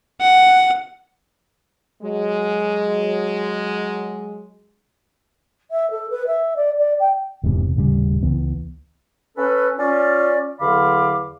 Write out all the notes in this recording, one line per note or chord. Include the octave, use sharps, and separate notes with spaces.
F#5
F#3 G#3
E5
A4
B4
E5
D5
D5
G5
E1 E2 G#2 C3
D#1 A2 C#3 G3
C#2 E3 B3
C#4 A4 B4
C#4 F4 D5
E2 D3 F#3 F5 B5 D6